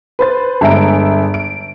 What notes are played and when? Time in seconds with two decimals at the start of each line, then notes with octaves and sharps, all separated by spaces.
0.19 B4 C5 A6
0.61 G1 G#3 E5 G#5 A#5 D7
1.34 D7